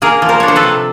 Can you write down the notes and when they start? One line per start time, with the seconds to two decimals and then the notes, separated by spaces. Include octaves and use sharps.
0.02 A#3 G#4 A#4
0.22 F3
0.29 A#4 C5
0.40 D4 C#5
0.48 C5
0.56 A4 B4
0.63 C3